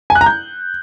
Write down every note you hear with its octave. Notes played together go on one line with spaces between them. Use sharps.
G#5
F#6
A#5
G6